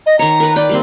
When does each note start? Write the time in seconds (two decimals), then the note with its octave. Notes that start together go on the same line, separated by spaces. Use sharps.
0.06 D#5
0.19 D#3 C#5 A#5
0.40 A#4 B4
0.56 D5 G5
0.69 G3 A#3 C4